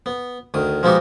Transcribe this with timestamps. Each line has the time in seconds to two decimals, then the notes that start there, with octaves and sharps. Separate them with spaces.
0.06 B3
0.54 D2 D#3 D#6
0.83 F3 G#3 B3 D#4 F#4 G4